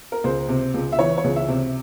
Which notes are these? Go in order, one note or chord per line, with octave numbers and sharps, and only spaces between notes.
A#4
C#2 C5
C3
C#2
E5
E3 C#5
C#5
C#2
E5
C3